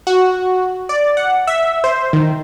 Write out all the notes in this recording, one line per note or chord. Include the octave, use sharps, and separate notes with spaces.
F#4
D5
F#5
E5
C5
D#3